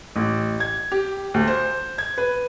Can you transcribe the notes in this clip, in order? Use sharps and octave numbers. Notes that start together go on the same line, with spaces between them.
A1
G#6
G4
D2
C5
G#6
B4